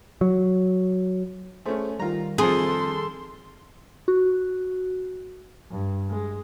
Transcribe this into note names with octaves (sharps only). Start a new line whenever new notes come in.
F#3
A3 C#4 G#4 C5
D#3 G3 F4 A#5
F2 F3 G#4 A4 C6
F#4
G2
G#3